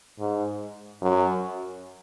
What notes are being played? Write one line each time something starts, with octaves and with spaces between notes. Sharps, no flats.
G#2
F#2